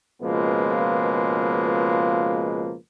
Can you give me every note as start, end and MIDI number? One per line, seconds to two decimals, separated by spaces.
0.22 2.74 37
0.22 2.74 47
0.22 2.74 53
0.22 2.74 56
0.22 2.74 58
0.22 2.74 71